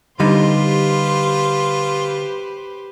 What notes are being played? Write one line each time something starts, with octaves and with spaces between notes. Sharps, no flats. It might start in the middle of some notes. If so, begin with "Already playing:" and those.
D3 G3 D#4 F4 G4 B4 C5